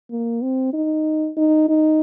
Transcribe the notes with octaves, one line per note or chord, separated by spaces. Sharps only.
A#3
C4
D#4
D#4
D#4